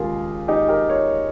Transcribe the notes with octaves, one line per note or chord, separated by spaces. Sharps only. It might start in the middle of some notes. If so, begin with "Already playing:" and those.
Already playing: D#2 C#3 G#3 F4 G4 G#4 A#4
D#4 G4
G4 A#4
A#4 C#5